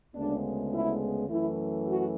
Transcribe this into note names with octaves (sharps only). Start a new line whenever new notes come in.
D2 C#3 G#3 B3 D4
E4
F#2 E3 A3 E4
F#4